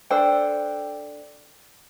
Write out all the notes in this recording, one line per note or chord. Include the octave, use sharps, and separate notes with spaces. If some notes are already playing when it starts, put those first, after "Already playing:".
D4 A4 C5 G5